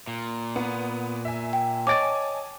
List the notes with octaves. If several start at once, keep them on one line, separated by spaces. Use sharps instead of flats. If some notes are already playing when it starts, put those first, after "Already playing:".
A#2
B3
E5 G#5
G5
C#5 D#5 G#5 A5 D6 A6 D7